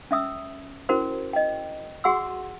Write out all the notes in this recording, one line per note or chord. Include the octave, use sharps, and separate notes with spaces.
C#4 E5 D#6 E6
C#4 E4 F#4 A#4 C5
D#5 G5
F#4 G#4 F#5 C6 E6